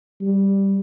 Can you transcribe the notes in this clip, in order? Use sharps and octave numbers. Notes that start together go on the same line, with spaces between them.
G3